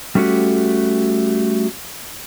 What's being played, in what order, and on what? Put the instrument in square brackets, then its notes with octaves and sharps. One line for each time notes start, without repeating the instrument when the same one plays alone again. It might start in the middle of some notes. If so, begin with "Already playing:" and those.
[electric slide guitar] G3 A3 C#4 E4 F#4 G4